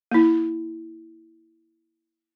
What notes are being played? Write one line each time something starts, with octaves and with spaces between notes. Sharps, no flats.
A#3 E4